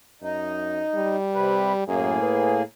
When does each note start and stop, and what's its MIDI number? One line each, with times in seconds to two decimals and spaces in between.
0.22 0.83 42
0.22 1.16 63
0.95 1.84 55
1.34 1.72 48
1.34 1.72 71
1.87 2.21 42
1.87 2.62 45
1.87 2.62 58
1.87 2.62 68
2.22 2.58 71